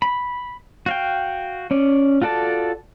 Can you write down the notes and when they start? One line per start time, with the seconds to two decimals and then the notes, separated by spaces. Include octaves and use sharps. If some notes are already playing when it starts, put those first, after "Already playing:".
0.02 B5
0.86 F#4 F5 G5
1.71 C#4 D5
2.22 F4 F#4 A4 D5 A5